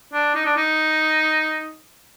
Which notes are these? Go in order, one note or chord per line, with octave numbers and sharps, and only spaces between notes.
D4
D#4
D4
D#4